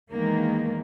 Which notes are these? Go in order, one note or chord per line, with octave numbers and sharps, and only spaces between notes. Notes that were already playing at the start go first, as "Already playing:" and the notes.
E2 D#3 G#3 A#3